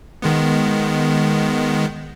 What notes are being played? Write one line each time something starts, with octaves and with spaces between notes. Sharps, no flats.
D#3 G#3 B3